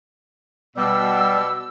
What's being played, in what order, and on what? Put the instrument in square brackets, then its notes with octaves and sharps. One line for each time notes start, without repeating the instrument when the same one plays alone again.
[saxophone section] B2 [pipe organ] G3 [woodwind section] E6